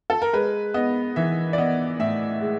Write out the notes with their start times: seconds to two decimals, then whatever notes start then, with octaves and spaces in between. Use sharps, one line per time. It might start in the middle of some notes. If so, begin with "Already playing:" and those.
0.10 A4
0.22 A#4
0.33 G#3 B4
0.74 B3 D#5
1.16 E3 E5
1.53 D5
1.58 B3 D#5
1.99 A2 E5
2.41 G#3